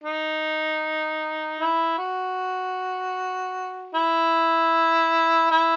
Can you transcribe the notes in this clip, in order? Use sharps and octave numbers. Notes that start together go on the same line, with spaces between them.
D#4
E4
F#4
E4
E4